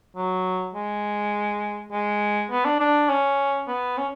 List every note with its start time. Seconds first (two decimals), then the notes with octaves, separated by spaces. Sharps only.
0.16 F#3
0.75 G#3
1.92 G#3
2.51 B3
2.65 D4
2.80 D4
3.09 C#4
3.68 B3
3.98 C#4